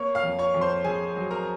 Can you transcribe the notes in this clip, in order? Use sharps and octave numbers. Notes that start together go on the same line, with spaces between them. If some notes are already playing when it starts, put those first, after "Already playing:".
Already playing: A#3 C#5 C#6
F5 F6
F2
C#5 C#6
F2
C5 C6
F2 G#4 G#5
F#3
A#4 A#5